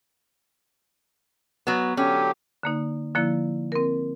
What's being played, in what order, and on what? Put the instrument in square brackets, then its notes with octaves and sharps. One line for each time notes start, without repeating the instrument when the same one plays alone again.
[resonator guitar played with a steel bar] F#3 B3
[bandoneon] D3 F#3 G4 [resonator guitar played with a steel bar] C#4
[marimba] D3 A#3 D#4
D3 F3 A#3 E4
C4 A#4